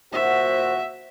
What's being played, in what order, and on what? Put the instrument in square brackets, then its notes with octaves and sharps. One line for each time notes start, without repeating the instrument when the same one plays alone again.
[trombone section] A#2 F#4 [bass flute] C5 [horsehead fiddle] E5